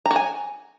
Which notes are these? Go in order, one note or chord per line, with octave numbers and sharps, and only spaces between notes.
A#5
F#4
G#5